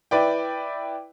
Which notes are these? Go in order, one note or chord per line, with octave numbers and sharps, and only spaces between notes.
E4 B4 D5 G5